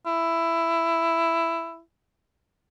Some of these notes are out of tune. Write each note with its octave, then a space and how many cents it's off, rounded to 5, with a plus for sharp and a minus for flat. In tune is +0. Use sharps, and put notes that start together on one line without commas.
E4 +10